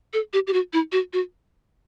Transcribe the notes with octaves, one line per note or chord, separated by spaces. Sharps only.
A4
G4
G4
F#4
E4
F#4
F#4